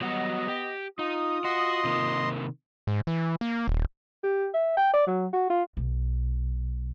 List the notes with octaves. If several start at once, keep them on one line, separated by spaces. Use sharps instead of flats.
F#3 G3 B3 F#4 D#5
G4
D#4 F4 D#6
F#4 D#5 C6
C3 D#3 A#3
G#2
E3
A#3
D#1
G4
E5
G5
D5
F#3
F#4
F4
B1